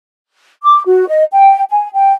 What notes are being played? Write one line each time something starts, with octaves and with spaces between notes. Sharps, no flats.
D6
F#4
D#5
G5
G#5
G5